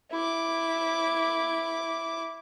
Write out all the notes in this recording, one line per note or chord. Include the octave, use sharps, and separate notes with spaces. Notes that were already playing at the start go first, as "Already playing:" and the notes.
E4 D6